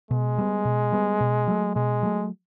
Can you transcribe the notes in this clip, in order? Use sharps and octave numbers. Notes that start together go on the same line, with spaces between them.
B2 G#3
G3 B3
B2
G3 B3
B2
F#3 A3
B2 G#3
F#3 A3